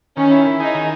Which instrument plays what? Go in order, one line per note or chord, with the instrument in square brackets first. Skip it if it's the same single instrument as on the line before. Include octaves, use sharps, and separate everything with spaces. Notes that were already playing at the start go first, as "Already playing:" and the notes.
[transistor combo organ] D#3 [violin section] C#4
[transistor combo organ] E4
E4
[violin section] D#4 [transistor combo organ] G#4
[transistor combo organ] D#3